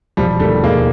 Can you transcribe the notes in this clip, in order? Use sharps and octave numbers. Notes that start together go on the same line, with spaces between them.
E1 F3 G3
D#2 G3 A3
E1 G#3 A#3